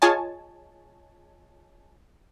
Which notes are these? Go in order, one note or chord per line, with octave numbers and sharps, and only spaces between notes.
F4 G#4 C#5 D#5 G#5 A5